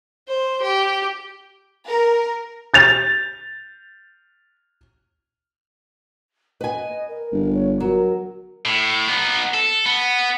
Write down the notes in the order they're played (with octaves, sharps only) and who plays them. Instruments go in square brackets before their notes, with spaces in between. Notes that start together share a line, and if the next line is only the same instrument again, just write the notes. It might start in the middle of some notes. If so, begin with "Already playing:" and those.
[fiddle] C5
G4
[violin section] A#4
[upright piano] G6 A6 F7
[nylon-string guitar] B4 G#5 [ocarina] D#5
[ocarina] A#4
[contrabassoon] G1
[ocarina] C#5
[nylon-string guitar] F#3 [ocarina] A#4
[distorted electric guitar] A2
B3 D#4
A4
B3